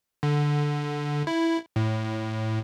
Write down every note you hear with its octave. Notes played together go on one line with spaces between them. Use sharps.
D3
E4
A2